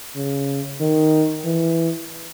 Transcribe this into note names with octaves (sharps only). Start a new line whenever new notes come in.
C#3
D#3
E3